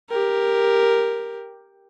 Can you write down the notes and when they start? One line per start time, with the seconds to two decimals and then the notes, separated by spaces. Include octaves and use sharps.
0.10 G4 A#4